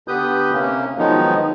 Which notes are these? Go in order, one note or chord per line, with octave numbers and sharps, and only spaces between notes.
D3 B3 G4 B4 D#6 G6
C3 A#3 C#4
D#3 F3 F#3 G#3 B3 D#4